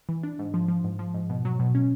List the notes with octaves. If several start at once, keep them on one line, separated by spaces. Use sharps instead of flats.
E3
D4
G#2
F3
F3
G#2
F3
G#2
B2
F#3
B2
C#4